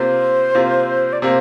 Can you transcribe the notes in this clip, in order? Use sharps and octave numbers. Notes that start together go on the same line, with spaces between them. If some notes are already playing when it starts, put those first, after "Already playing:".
Already playing: C3 A#3 F4 C5
C3 A#3 F4
D5
C3 A#3 C5